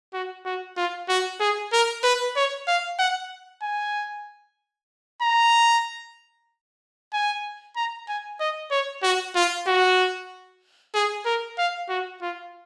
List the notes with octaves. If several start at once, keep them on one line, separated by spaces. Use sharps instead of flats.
F#4
F#4
F4
F#4
G#4
A#4
B4
C#5
F5
F#5
G#5
A#5
G#5
A#5
G#5
D#5
C#5
F#4
F4
F#4
G#4
A#4
F5
F#4
F4